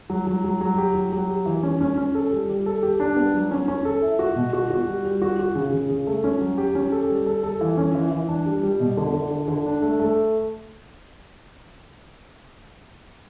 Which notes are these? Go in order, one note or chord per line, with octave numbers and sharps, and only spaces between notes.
F#3
F#3
F#3
F#3
G4
F#3
F#3
G4
E3
C#4
C#4
C#4
A4
G3
G3
A4
G4
D4
B3
F#3
C#4
C#4
A4
E4
F#4
B2
F#4
F#4
G3
G3
F#4
F#4
C#3
C#3
C#3
A3
C#4
F#3
G4
C#4
A4
G3
A4
A4
E3
C#4
E3
E3
D4
G3
G3
B2
D3
D3
D3
D3
D4
A3
A3